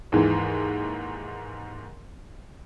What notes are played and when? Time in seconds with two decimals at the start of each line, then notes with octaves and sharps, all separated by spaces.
0.12 D#2 G#2 E3